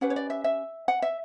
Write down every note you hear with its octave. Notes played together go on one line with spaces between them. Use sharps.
C#4 G4 B4 F#5
C#5
D5
E5
E5
F#5
E5